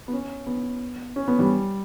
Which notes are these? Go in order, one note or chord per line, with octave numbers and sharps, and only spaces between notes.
B3
C#4
B3
C#4
B3
G3